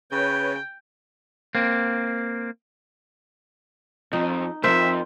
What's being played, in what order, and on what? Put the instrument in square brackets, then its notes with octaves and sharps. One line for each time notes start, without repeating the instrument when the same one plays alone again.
[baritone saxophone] C#3 [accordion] B4 C#5 [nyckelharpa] G5
[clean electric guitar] A#3 C4
[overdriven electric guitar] F2 [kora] D#4
[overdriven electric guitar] C2 F2 [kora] A#4 C5 [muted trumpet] E5